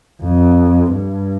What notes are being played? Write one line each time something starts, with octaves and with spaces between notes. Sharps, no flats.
F2
G2